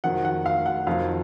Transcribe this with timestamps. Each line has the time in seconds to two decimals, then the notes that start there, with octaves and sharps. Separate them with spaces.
0.04 F2 D#3 F#3 F#5
0.25 F#5
0.46 F5
0.66 F#5
0.87 F2 D#3 F#3 F5